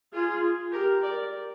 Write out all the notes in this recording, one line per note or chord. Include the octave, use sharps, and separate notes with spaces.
F4 G#4
G4 A#4
A#4 D5